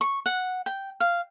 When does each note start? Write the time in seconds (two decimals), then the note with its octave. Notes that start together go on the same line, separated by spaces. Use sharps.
0.01 C#6
0.26 F#5
0.66 G5
1.00 F5